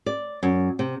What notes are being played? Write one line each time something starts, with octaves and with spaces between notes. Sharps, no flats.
D5
F#2
C3